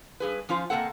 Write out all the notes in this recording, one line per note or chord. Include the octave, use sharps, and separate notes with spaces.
G2 G#4 B4
F3 C#4 F4 C5
C3 A#3 C4 A4 F#5